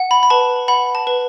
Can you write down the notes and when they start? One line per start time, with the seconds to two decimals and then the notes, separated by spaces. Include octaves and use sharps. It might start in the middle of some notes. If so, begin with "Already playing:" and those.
Already playing: F#5
0.11 B5
0.23 B5
0.30 B4 A5
0.68 F#5 B5
0.95 A5
1.07 B4